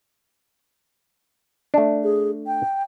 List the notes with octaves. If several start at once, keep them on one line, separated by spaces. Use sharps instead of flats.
A3 D4
G#4
G5